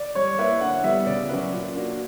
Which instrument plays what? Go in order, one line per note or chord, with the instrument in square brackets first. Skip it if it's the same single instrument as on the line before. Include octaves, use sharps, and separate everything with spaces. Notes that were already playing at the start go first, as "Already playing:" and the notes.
Already playing: [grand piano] D5
[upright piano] G3 [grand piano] C#5
[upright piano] A#3 E4 B4 [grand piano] E5
[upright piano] D3 [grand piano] F#5
[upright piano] G3 B3 E4 [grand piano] E5
[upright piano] C#3 [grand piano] D5
[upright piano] F#3 C#4 F#4 B4
A#2
A#3 D4 F#4